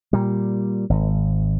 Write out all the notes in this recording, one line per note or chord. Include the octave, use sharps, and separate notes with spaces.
A#2 G3
G#1